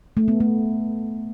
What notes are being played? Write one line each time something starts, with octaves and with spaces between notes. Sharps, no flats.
A3
B3
A3